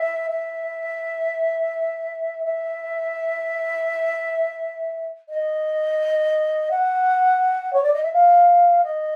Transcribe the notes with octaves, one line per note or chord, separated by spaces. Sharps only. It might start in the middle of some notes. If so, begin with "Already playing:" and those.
Already playing: E5
E5
E5
D#5
F#5
C#5
D5
D#5
E5
F5
D#5